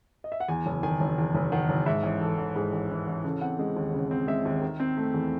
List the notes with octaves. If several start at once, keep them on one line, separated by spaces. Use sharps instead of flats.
D#5
E5
F#5
E2 G#5
F#1
D#3 G#5
F#1
E2
F#1
D#3 F#5
F#1
G#2 E5
A1
E3 A4
A1
G#2 G#4
A1
E3
A1
C#3 A4
C4 F#5
G#3
D#2
C#3
C4
G#3 E5
D#2
D#3
C4
A3
E2